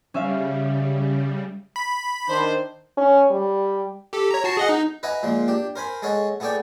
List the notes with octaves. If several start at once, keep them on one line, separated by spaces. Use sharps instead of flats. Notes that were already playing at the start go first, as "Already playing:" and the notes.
C#3 G3 C#4 E5 F5
B5
D#3 D4 C5
C#4
G3
G4 A4
C#5 A#5
F#4 A5 C7
G#4 D#5 F#5
D#4
B4 D#5 E5 F#5 G#5 A#5
A#2 F3 G#3 A#3
D4 G4
A#4 C5 G#5 B5
G#3 G#4 A4 C#5 D#5 F#5
A3 B3 G#4 A4 D5 G5